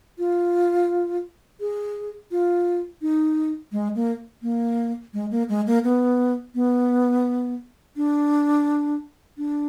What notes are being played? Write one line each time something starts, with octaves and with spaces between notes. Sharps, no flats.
F4
G#4
F4
D#4
G#3
A#3
A#3
G#3
A#3
G#3
A#3
B3
B3
D4
D4